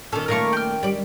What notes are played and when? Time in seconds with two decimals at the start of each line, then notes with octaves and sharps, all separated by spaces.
0.12 A#2 D#3 C#4 A4
0.28 A#2 A3 A#4 F5 C#6
0.53 G5 F6
0.83 G3 D5